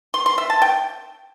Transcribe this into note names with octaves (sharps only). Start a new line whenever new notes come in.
C6
C6
E5
A5
G5